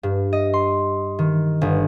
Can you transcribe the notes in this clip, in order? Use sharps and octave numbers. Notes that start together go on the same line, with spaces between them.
G2
D#5
C6
D#3
G1